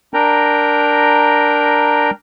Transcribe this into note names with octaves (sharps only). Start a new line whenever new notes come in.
D4 A#4 G5 A#5